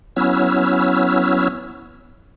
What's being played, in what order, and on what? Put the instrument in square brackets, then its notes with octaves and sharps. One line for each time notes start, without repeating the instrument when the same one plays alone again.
[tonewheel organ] F#3 B3 C#4 E4 E6 F6